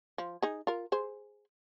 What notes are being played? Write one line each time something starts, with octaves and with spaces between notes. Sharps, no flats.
F3
D#4 G#4
F4 A#4
G#4 C5